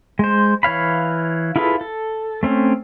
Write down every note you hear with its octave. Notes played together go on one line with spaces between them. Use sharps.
G#3 C5
E3 C#5 F5 B5
E4 F4 G#4 A4 B4
A4
A3 C4 C#4